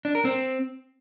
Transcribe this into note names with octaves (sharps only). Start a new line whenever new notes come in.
D4
A#4
C4